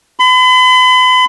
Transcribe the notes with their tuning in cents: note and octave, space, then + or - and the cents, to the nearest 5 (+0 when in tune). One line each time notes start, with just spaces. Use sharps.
B5 +40